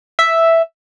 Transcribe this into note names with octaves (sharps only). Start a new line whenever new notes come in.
E5